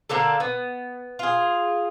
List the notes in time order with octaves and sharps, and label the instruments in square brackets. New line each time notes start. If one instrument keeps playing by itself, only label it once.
[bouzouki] D3 A#3 D4 A4
B3
F4 G#4